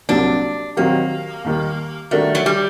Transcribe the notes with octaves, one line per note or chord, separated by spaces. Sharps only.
C2 C3 F#3 A#3 D4
D#3 F#3 A#3 C4 G4
D#2 D#3 G3
D#3 G3 A3 D4 F#4 A#4
F#3
G3